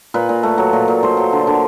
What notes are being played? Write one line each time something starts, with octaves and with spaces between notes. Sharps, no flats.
A#2 B4
A#2
A3
F#3
A#2
A#2
A3 C5
F#3
D3
D3